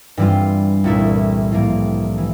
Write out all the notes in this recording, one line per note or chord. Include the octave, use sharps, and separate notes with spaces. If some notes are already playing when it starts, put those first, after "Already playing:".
G2 E3 G3 C4 F4
C2 A#2 A3 E4
A2 F3 A#3
E3